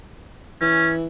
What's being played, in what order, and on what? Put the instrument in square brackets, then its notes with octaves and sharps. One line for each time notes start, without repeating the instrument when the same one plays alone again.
[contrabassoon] E3 [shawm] C#4